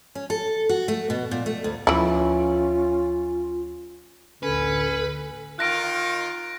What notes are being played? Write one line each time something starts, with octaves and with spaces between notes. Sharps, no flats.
C#4
A4
F#4
A3
B2
A#2
A3
D2
D2 E3 F3 C#4 E4 F4
A1 D2 D3 C#4 A4 B4
D#3 F4 F#6 A#6 D7